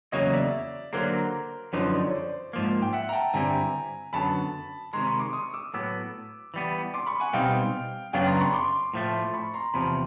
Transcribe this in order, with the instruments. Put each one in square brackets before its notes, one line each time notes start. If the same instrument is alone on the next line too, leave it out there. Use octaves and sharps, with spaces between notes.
[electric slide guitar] E2 C#3 F#3 A#3 [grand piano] C#5 D#5
[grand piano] D5 E5
[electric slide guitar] D3 F#3 A#3 [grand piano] A#4 C5
[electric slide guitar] F#2 D3 F3 D#4 [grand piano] B4 C#5
[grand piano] D5
C#5
C5 D5
[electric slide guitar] G#2 F3 A#3
[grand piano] G5
E5 F#5
A#5
G5 A5
[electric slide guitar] G2 D3 G3 C4 E4 [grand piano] G#5 A#5
[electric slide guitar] F#2 D3 F#3 B3 [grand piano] A5 B5
[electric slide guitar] C3 D#3 G#3 [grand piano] A#5 C6
[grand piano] B5 C#6
C6 D6
C#6 D#6
D6 E6
[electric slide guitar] A2 F#3 B3 [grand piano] D6 E6
[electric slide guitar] E3 G3 B3
[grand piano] C6 D6
B5 C#6
F#5 G#5
[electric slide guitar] B2 G3 C4 D#4 [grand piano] F5 G5
[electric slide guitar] F#2 C#3 F#3 B3 D4 [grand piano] F5 G5
[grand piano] A#5 C6
B5 C#6
C6 D6
[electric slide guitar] A2 F3 A3
[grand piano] B5 C#6
A#5 C6
[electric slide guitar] E2 C3 F3 [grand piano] A5 B5